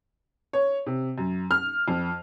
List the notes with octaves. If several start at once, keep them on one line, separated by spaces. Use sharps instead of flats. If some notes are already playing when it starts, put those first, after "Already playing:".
C#5
C3
F#2
F6
F2